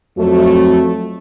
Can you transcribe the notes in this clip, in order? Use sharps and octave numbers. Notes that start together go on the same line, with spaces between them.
F2 F#3 A3